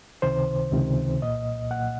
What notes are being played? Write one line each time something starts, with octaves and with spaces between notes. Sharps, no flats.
C#2 C3 D#3 C5
C#2 C3 D#3
C2 A#2 D#5
A#2 F#5